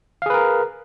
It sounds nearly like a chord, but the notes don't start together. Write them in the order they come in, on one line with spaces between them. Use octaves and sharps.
F5 G#4 B4 A#4